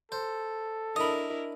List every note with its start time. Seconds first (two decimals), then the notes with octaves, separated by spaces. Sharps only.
0.12 A4 C5
0.96 D4 E4 A#4 D#5 B5 D#6